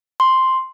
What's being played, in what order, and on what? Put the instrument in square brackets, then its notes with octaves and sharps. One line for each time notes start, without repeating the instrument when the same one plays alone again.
[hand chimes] C6